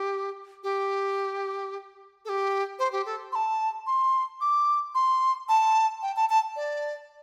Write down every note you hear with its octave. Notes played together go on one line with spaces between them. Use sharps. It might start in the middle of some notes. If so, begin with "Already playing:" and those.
Already playing: G4
G4
A4
G4
C5
G4
A4
C6
A5
C6
D6
C6
A5
G5
A5
A5
D5